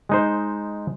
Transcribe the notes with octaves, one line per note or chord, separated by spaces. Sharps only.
G#3 D#4 C5